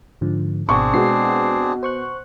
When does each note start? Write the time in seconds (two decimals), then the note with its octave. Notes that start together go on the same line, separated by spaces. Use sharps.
0.21 G#2 D3 F3
0.69 G#1 B2 C4 D4 G#4 F#5 C#6
0.94 B2 G#3 C7
1.83 C5 C#6 F#6